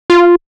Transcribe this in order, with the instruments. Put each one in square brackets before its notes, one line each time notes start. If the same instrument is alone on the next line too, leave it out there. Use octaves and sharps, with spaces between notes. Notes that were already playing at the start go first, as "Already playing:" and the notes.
[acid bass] F4